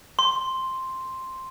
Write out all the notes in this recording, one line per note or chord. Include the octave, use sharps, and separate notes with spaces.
C6